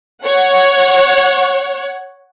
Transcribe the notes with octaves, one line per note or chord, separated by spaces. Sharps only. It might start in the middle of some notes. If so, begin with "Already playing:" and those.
C#5 F#5